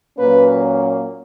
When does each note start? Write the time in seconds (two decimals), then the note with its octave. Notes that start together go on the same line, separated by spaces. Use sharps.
0.18 A#2 F#3 A#3 C#4 B4